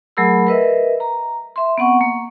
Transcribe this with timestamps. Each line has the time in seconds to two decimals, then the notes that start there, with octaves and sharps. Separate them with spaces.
0.17 F#3 A3 G#4 A#4 B5 E6
0.47 A#4 B4 D#5 E5
1.00 A#5
1.56 E5 C6
1.78 B3 C4 F#5 C#6
2.01 A#3